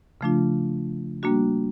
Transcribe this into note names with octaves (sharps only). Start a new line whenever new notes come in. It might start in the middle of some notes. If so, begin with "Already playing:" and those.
C#3 F3 A3 D4 F4
G3 A#3 D4 F#4